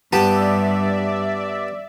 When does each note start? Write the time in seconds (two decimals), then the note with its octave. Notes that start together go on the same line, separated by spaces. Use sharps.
0.13 G2 B3 G4 D5 E5 A5